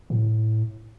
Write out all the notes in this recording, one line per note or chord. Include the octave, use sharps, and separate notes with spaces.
A2